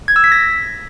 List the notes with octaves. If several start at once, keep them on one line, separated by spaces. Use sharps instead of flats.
G#6
E6
B6
A#6